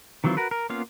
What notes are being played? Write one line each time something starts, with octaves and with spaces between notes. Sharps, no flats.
D#3 E3 F#3 C4 F4
F#4 A#4 B4
A#4
A#3 B3 C#4 F4 F5